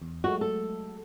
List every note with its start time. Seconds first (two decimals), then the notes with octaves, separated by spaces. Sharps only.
0.02 E2
0.24 F#3 G#3 A3 F#4
0.41 A4